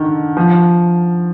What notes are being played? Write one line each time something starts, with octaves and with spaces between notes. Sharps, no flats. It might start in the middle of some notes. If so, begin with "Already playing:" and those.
Already playing: D3 D#3
F3